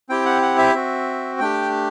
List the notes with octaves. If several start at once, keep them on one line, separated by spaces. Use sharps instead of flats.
C4 E4 G4 G5
F#5
F#5
E5
C4 F#4
A3 D4 G4 G5